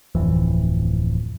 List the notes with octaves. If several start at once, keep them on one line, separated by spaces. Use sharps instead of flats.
D1 F2 E3